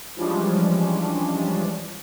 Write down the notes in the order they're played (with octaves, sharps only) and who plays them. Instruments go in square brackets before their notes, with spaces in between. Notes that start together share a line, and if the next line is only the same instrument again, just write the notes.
[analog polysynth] E3 F3 G3 G#3 C#4 D4